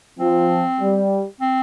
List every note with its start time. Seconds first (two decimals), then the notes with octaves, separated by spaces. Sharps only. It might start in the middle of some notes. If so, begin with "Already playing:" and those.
0.19 F3 C4
0.80 G3
1.41 C4